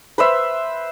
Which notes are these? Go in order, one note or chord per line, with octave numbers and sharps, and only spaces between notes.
B4 C5 E5